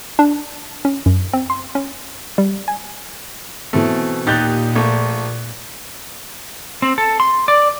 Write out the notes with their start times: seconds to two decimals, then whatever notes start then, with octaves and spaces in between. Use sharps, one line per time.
0.19 D4
0.85 C#4
1.06 F#2
1.33 C4
1.50 C6
1.75 C#4
2.38 G3
2.68 G#5
3.73 B2 E3 A3 C4
4.27 D#2 A#2 D#4 G4 F#6 G6 A6
4.75 A#1 A3
6.82 C4
6.98 A4
7.20 C6
7.48 D5